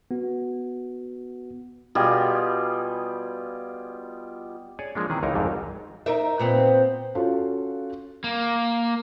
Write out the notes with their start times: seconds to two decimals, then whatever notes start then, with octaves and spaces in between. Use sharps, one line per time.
0.11 B3 F#4
1.95 B2 G3 F4 G#4
4.79 G#4 C#5 D5 G#5
4.95 F3 G#3 A#3 D4
5.10 C3 D#3 E3 C#4 G#4
5.23 C#2 E3 D#4 A#4 A#5
5.35 G#1 F2 G#2 F#3 G3
6.06 D#4 A#4 E5
6.39 A#2 B3 C4
7.15 C#4 F4 F#4 A4
8.24 A#3